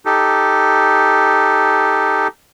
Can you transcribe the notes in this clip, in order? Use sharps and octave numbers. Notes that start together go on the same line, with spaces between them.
D#4 G4 A4